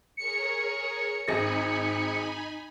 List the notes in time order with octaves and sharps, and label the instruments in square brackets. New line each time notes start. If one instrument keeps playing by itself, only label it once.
[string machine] G#4 A#4 C#5 [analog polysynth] C#7
[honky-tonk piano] G#1 G#4 A#6 [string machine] D#4 G#5 B5